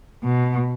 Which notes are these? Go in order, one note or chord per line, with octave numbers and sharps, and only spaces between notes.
B2